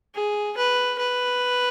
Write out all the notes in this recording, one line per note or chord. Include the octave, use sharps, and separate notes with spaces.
G#4
B4
B4